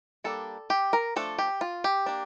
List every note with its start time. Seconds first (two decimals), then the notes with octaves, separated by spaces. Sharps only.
0.24 G3 A#3 D4 A4
0.70 G4
0.93 A#4
1.16 F3 A3 D4 A4
1.38 G4
1.61 F4
1.84 G4
2.06 A#3 D4